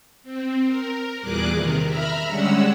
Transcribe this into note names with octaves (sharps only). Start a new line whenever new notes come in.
C4
A#4
E2 A#2 G3 G#4 D6 F#6
C3 D#3 A#4
E5 A#5 B5 F6
D3 G3 G#3 C#4 F#5 E6